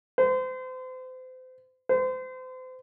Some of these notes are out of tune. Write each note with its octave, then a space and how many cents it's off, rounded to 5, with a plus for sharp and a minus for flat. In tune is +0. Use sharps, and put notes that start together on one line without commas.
C5 -35
C5 -35